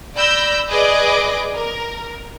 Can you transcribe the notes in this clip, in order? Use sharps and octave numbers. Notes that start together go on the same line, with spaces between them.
D5 B5 E6 G6 A#6
G#4 B4 D5 D#5 D6
A#4